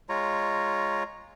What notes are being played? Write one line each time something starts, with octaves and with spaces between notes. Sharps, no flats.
G#3 F4 C#5 A#5